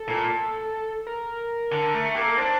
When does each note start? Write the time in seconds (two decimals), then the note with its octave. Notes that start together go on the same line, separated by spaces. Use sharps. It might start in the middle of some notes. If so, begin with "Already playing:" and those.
Already playing: A4
0.08 A#2
1.07 A#4
1.72 D3
1.94 A3
2.15 A#3 G4
2.23 A4
2.30 A#4
2.37 D4 C5